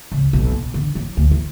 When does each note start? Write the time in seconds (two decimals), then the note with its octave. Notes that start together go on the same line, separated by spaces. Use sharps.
0.12 C#2
0.33 B1
0.51 B2
0.74 D3
0.95 F#3
1.17 D2
1.31 E4